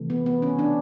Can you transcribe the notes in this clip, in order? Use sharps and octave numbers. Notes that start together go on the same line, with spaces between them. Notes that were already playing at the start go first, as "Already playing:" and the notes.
Already playing: C3 E3 A3
B3
B3
C#4
D4